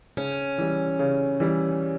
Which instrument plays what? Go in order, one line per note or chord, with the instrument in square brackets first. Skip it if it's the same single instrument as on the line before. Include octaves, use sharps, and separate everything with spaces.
[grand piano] C#3 [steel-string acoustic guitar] C#4
[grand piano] E3 G3
C#3
E3 G3